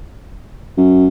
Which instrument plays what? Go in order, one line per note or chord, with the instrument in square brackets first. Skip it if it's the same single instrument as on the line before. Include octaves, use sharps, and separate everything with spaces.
[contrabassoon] F#2